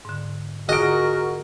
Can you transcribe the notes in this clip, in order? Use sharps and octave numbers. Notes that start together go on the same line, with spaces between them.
G#2 D3
D3 F4 F#4 G#4 A#4 D#5 D7